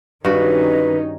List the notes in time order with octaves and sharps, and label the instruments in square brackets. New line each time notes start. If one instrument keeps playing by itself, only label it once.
[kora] G2 F#4 [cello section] D#3 C#4 D#4 [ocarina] B4